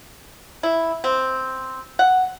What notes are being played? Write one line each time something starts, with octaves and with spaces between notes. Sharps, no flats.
E4
C4
F#5